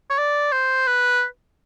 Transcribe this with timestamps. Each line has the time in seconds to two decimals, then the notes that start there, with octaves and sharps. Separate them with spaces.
0.10 C#5
0.18 D5
0.52 C5
0.87 B4